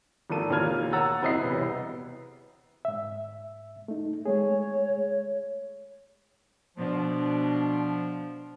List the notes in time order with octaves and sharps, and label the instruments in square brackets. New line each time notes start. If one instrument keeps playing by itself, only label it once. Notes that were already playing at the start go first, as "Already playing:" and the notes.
[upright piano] G#1 F3 A#3 A4 D#7
E1 D#2 A#3 F4 F6 G#6
C#5 F#5 A#5 E6 F#6 A6
F#1 C4 E4 D#5 B5 C7
E1 C2 B3
[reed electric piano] G#2 E5
A3 D#4
[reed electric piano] G#3 A3 G#4 [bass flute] C#5
[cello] B2 D4 [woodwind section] F3